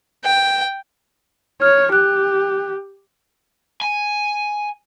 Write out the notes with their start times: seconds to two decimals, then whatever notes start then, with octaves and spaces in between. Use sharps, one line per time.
0.24 G5
1.62 C#5 F6
1.92 G4 F#6
3.81 G#5